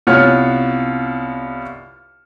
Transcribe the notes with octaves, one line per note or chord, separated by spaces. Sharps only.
C2 B3 F4 C#5 F6 C#7